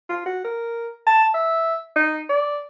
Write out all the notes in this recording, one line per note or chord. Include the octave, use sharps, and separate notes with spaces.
F4
F#4
A#4
A5
E5
D#4
D5